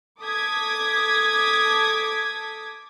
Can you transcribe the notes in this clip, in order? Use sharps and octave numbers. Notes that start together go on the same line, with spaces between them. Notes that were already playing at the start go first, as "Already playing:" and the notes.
A4 D6 D#6 G#6 B6